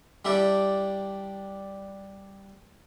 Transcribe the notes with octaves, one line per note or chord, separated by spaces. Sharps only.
G3 D4 E4 G4 D5